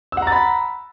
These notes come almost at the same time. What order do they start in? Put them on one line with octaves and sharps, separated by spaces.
E6 F#5 A#5 A6 B5